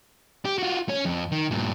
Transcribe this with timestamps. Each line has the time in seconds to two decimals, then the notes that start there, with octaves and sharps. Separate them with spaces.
0.45 G4
0.58 F4 F#4
0.89 C#4
1.05 F2
1.32 D#3
1.51 G2 A#2